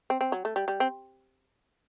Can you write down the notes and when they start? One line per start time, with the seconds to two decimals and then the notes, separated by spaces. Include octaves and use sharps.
0.10 C4
0.21 C4
0.32 F#3
0.45 A3
0.56 G3
0.68 G3
0.80 C4